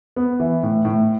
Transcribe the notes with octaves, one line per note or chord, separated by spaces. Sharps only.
B3
E3
A2
A2